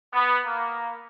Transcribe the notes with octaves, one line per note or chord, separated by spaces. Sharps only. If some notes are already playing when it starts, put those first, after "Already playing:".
B3
A#3